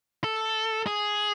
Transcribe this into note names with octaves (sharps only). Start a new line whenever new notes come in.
A4
G#4